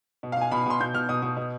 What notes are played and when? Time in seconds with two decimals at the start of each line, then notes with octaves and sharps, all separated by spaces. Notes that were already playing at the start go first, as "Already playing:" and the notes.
0.23 B2
0.32 F5
0.37 B2 G#5
0.51 B2 B5
0.66 B2 C6
0.81 B2 G6
0.94 B2 F6
1.09 B2 D#6
1.22 B2
1.37 B2